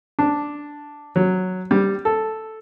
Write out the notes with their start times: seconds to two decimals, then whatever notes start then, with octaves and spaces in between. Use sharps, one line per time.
0.19 D4
1.16 F#3
1.71 G3
2.05 A4